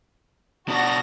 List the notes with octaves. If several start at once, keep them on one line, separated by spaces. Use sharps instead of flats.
B2 D4 F#4 A#6